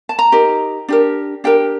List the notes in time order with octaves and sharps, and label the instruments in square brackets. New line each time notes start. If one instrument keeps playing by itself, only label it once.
[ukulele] A5
A#5
D#4 G4 A#4
D4 G4 A#4
D4 G4 A#4 G5